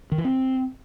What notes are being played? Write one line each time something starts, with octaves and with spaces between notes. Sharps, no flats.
D#3
E3
C4